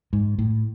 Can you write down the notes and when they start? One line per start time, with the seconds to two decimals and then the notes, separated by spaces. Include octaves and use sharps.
0.13 G#2
0.39 A2